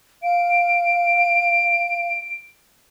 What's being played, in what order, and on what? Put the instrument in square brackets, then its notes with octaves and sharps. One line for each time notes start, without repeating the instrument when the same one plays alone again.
[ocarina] F5 [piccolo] D7